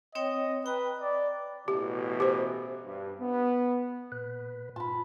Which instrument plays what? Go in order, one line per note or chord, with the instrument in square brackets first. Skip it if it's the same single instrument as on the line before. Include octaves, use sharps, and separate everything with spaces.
[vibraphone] C4 C#5 G5 [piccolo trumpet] D#5
[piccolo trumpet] B4 [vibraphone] G5 A#5
[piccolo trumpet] D5
[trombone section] A1 B2 E3 [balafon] G4
[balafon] G4 C5
[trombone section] G2
B3
[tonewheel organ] A#2 B4
[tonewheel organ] G#2 F4 [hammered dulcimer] A5 B5